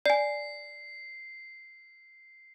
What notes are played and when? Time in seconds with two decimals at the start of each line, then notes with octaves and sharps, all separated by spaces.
0.06 D5 G#5 C7